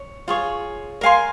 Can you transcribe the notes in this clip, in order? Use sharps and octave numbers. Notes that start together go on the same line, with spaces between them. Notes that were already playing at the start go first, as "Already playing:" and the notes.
Already playing: C#5
F4 G#4 C#5
A#4 F5 G#5 C6